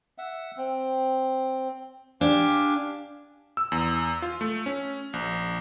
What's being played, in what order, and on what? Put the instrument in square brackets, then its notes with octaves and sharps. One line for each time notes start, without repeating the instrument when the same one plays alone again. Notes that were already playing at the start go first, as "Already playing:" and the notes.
[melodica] E5 F#5
C4
[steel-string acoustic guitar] D4 [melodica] G4 F5 G#5
[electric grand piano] E6
E2
F4
A3
C#4
A#1